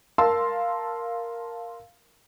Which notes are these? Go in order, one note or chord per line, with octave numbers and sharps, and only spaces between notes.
A#4 F5 A5 C6 E6